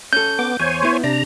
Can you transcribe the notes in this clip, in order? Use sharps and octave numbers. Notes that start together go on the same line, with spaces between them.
C#4 A4 G6
B3 D6
E2 C5 C#5 G#5
B3 E4
C3 D4 A#5